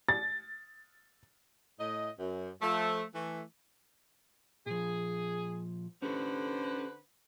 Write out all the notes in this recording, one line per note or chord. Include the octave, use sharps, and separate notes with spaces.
A6
A2 D#5
F#2
F3 A3
E3 A3
A#2 F3 G#4
D3 C#4 G4 A4 B4 C5